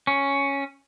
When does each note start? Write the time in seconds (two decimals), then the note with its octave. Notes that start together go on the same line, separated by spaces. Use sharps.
0.07 C#4